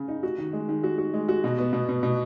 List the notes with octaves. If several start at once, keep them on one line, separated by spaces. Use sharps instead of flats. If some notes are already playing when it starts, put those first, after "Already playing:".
Already playing: C#3
D#4
F#4
D#3
G#3
D#3
F#4
F#4
G#3
F#4
B2
B3
B2
B2
B2